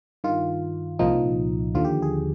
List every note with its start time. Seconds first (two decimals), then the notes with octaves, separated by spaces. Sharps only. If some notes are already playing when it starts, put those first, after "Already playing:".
0.24 G2 D#3 F4
0.99 C2 A#2 F3 D#4
1.75 D#2 D3 F3 F4
1.85 G4
2.02 G#4